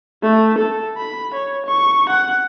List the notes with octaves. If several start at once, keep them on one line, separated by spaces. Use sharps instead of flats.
A3
A4
B5
C#5
C#6
F#5